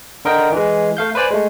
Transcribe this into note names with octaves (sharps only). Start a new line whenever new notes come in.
D3 A#4 D#5 G5
E3 G#3
A3 F5 G6
B4 C5 D5 G#5
G#3 A3